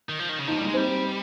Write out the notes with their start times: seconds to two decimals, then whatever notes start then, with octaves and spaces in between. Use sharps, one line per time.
0.09 D#3
0.19 F3
0.29 D#3
0.38 C#3
0.47 F3 D#4
0.58 G3 D#4
0.67 G#3
0.74 G3 C4